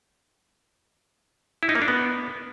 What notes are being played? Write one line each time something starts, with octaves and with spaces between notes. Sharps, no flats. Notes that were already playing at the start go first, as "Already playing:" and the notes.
E4
D#4
A#3
D4
B3